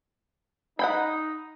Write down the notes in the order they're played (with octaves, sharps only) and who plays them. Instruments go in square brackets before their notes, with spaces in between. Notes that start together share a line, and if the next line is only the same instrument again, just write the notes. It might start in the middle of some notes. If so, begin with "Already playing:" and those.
[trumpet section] D#4 [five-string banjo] F#5 G5 B5